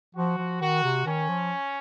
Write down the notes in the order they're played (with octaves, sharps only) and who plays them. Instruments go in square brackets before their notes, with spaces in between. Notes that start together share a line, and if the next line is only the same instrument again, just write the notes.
[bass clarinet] F3 [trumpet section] F#4
[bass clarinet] F3
[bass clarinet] D#3 [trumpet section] F#4
[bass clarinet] C3
[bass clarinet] D#3 [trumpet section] C#4
[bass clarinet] F3